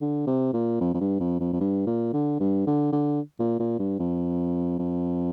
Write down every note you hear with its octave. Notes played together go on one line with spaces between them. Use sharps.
D3
C3
A#2
F2
F2
G2
F2
F2
F2
G2
A#2
D3
G2
D3
D3
A#2
A#2
G2
F2
F2